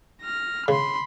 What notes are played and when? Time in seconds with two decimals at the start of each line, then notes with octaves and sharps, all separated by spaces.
0.22 F6 A#6
0.68 C#3 B5 C6